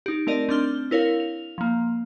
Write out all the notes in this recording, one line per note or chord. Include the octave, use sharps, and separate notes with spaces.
D#4 G4
A3 C4 A#4 D5 D#5
C4 D4 C6 F6 G7
E4 A#4 C#5 F5
F7
F3 A#3